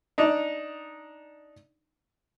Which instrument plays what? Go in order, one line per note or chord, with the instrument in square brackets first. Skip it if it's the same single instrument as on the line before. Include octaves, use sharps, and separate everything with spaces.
[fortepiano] D4 D#4